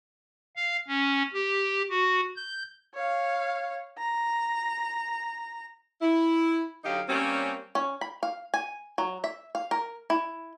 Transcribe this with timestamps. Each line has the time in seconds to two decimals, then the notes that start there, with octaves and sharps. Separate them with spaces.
0.56 F5
0.88 C#4
1.33 G4
1.90 F#4
2.36 G6
2.94 C#5 F5
3.98 A#5
6.01 E4
6.85 D3 F#3 D#4 G4 D#5 F5
7.09 G3 A#3 C4 C#4
7.75 C#4
8.01 B5
8.23 F5
8.54 G#5
8.98 F#3
9.24 E5
9.55 F5
9.71 A#4
10.10 E4